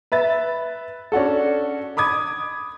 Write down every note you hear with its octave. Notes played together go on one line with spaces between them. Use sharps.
B4 E5 A6
C#4 D4 F#4 A4
B5 D6 D#6 G#6